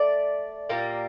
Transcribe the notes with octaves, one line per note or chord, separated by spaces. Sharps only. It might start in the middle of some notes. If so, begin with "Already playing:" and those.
Already playing: A3 D5
A#2 G3 A#3